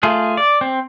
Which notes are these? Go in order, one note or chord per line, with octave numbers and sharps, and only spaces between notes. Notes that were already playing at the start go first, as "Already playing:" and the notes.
A3 F4 G#4
D5
C4